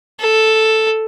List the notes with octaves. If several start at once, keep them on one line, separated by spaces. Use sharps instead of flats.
A4